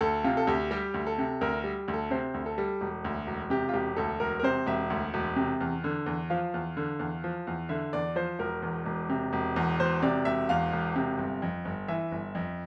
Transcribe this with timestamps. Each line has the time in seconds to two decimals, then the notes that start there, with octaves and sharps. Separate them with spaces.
0.01 D2 A4
0.24 C3 F4
0.37 A4
0.47 D2 G4
0.71 G3 G4
0.94 D2
1.07 A4
1.18 C3
1.41 D2 A#4
1.64 G3
1.88 D2
1.93 A4
2.10 C3 C5
2.34 D2
2.46 A4
2.58 G3
2.81 E1
3.05 D2
3.27 E1
3.50 C3 G4
3.69 F4
3.73 E1 G4
3.96 D2 A4
4.20 E1 A#4
4.39 A#4
4.43 C3 C5
4.66 E1 E5
4.90 D2
5.14 E1
5.36 C3
5.60 E2
5.84 D3
6.06 E2
6.30 F3 F5
6.54 E2
6.77 D3
6.99 E2
7.24 F3
7.47 E2
7.69 D3 E5
7.93 E2 D5
8.16 F3 C5
8.39 E1 A#4
8.62 E2
8.86 E1
9.09 C3
9.33 E1
9.56 E2
9.79 E1 C5
10.02 C3 D5
10.25 E1 E5
10.49 E2 F5
10.73 E1
10.96 C3
11.18 G1
11.42 F2
11.65 G1
11.88 E3 E5
12.12 G1
12.35 F2